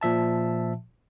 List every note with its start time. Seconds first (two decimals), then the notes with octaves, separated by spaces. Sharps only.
0.01 A#2 F3 E5 A5